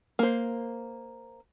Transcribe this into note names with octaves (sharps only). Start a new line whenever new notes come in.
A#3 C5